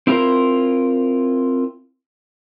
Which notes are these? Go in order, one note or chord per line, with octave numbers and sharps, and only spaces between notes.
C4 E4 F4 G4 A#4 C5